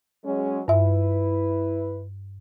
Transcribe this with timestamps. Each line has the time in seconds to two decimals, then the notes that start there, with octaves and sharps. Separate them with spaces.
0.25 F#3 G#3 C#4
0.68 G2 E4 B4 E5